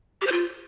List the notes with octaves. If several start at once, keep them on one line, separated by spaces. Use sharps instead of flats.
G4
C5
F4